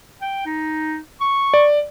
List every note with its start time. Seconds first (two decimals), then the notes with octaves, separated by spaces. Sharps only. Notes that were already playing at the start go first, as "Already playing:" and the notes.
0.21 G5
0.46 D#4
1.21 C#6
1.54 D5